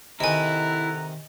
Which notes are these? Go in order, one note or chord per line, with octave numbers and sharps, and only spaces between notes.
C3 D#3 E4 A4 D#5 F#5 G#5 A#5